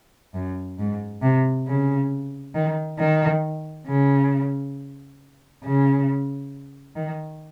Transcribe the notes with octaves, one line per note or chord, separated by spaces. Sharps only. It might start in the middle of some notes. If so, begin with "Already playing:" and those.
F#2
G#2
C3
C#3
D#3
D#3
C#3
C#3
D#3